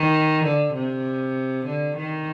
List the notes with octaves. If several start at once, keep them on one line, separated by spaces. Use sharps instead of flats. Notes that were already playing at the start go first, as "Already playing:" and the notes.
Already playing: D#3
D3
C3
D3
D#3